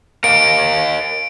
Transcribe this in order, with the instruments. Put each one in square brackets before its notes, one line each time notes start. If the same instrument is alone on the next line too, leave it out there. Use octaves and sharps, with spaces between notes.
[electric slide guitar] A#4 D#5 F5 [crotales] D7